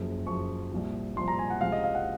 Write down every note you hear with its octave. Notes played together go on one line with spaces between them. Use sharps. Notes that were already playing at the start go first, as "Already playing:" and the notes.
Already playing: F#1 F#2 F3
F#1 F#2 F3 C#6
C2 A#2 F3
C2 A#2 F3 C6
A#5
G#5
F#5
C#2 C3 F3 F5
D#5
F5
F#5